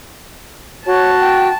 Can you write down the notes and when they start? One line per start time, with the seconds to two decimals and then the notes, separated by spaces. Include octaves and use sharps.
0.86 F#4 C#5 A5
1.20 G5